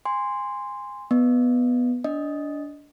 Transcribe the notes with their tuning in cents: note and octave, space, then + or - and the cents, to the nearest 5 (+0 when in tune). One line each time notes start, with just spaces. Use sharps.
G#5 -20 C6 -5
B3 +0 D#5 -35
D4 -20 D#5 +0